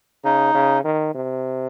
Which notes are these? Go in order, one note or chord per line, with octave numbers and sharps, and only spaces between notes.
C#3 D#4
C#3
D#3
C3